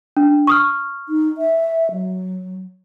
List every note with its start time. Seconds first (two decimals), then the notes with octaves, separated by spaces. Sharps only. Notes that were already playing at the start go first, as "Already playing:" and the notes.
0.17 D4
0.47 C#6 D#6 F6
1.09 D#4
1.38 E5
1.92 F#3